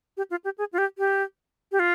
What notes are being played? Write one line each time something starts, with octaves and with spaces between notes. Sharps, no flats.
G4
F4
G4
G#4
F4
G4
G4
G4
F4